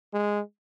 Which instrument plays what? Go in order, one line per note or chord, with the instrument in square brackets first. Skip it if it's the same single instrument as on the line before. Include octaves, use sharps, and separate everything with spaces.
[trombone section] G#3